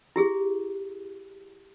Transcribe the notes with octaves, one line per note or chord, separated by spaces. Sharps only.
E4 G4 G#4